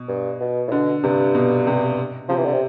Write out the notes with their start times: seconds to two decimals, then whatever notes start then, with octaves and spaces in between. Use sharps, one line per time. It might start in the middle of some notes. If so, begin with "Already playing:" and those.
Already playing: B2
0.09 G2
0.40 B2
0.68 A2
0.71 B2 D3
1.04 G2 C3
1.35 B2
1.67 C3
2.29 C3 F3
2.37 E3
2.45 D3
2.53 C3